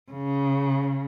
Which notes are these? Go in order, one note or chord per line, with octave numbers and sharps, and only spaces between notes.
C#3